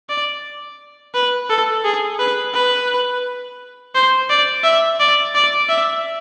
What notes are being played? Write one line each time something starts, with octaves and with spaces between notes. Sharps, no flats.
D5
B4
A4
G#4
B4
B4
C5
D5
E5
D5
D5
E5